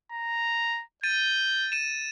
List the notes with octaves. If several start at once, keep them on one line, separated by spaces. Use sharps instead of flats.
A#5
G6 A6 D#7
D#7 E7